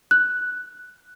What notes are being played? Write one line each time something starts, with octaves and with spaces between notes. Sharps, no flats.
F#6